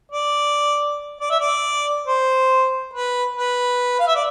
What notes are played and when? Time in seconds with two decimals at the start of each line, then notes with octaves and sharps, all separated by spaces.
0.12 D5
1.20 D5
1.30 E5
1.40 D5
2.06 C5
2.93 B4
3.36 B4
3.99 F5
4.08 E5
4.15 D5